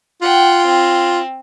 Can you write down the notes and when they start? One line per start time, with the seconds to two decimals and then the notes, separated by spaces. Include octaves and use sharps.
0.22 F4 F#5 G5
0.65 C4